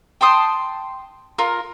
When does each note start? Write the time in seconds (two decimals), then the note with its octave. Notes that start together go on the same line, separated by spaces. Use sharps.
0.21 G5 A5 C6 D#6
1.38 F4 A#4